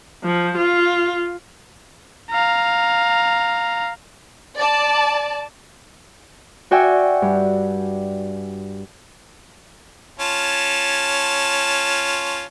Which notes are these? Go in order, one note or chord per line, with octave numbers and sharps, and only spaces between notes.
F3
F4
F5 A#5
D5 A5
F#4 D5 E5 G5 G#5 C#6
G2
C#4 F4 A5